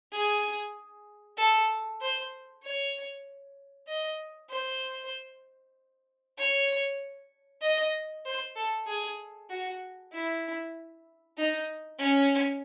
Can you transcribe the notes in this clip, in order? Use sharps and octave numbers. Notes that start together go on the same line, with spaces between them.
G#4
A4
C5
C#5
D#5
C5
C#5
D#5
C5
A4
G#4
F#4
E4
D#4
C#4